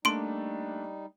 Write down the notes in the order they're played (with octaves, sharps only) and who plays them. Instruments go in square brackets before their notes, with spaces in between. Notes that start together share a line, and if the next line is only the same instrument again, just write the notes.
[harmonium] G3 D#4 [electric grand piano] A3 A#3 D4 [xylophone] C6 D7